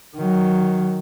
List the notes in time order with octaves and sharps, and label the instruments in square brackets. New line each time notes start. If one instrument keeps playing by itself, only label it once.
[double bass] D#3 F#3